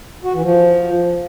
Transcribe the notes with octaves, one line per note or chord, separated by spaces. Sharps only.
F#4
E3
F3